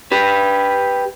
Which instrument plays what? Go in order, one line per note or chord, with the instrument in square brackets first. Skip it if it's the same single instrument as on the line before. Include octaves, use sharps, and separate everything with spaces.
[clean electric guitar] G4 B4